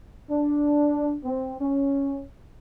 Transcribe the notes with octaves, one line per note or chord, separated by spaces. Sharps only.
D4
C4
C#4